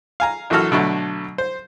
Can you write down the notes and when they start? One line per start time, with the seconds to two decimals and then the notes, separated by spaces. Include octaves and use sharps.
0.20 F5 G#5 A#5
0.50 A#1 E3 F#3 F#4 A4 F6
0.72 B2 D3 F#3 A3
1.38 C5